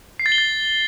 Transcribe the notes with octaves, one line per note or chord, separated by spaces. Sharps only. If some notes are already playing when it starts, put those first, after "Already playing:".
C7
A6
G7
A6